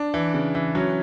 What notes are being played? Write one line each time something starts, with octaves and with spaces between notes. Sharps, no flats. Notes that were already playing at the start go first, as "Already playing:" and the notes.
Already playing: D4
E3
C#3
E3
F#3 C#4